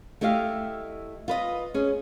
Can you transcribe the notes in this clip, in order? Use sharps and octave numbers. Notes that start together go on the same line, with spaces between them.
A3 E4 G4 D#5 F5
F4 B4 D#5
C#4 G#4